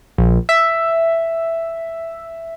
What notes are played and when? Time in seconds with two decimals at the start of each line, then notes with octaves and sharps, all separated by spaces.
0.18 A#1
0.49 E5